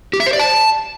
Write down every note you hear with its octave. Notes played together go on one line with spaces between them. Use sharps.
G4
E5
C5
D5
A5